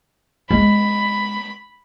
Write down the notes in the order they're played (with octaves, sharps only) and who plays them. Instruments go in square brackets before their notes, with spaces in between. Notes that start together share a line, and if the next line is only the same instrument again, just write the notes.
[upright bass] G#3 B3 [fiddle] B5